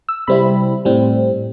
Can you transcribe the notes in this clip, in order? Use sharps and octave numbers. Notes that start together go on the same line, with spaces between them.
E6
C3 G3 C4 E4 B5
A2 G3 C4